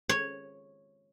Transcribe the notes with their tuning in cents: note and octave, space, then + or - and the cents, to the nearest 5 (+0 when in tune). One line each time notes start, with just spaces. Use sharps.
C#5 -5